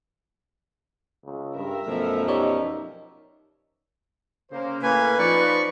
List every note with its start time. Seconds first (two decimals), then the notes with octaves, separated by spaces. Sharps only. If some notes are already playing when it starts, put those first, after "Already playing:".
1.25 C#2
1.56 G2 A#4 E5
1.86 F#2 B2 F3 A3
2.28 D#4 G4 C#5 D5
4.51 C#3 A#3 C5
4.83 A2 A#3 C#4 B4 G#5
5.18 F3 D#4 D5 C#6